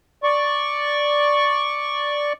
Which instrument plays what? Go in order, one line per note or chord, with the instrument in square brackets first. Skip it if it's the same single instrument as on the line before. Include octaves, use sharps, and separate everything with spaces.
[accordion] D5 C#6